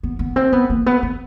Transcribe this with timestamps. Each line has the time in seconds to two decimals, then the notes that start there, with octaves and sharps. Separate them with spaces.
0.03 B3
0.19 B3
0.36 C4
0.53 B3
0.70 A#3
0.86 B3
1.03 B3